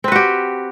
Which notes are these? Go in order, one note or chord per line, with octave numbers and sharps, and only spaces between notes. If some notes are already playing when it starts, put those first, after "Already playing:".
C4 F#4 G4 B4